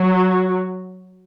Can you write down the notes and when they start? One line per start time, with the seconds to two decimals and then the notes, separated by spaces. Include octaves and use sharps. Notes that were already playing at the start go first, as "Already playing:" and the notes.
Already playing: F#3